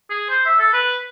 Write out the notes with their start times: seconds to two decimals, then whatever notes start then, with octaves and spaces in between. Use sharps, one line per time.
0.10 G#4
0.30 C5
0.46 E5
0.59 A4
0.73 B4